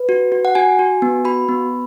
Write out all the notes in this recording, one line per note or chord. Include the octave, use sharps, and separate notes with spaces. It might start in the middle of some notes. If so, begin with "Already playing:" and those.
Already playing: B4
F#4
F#4
F#5
F#4 G#5
F#4
B3
F#4 B5
B3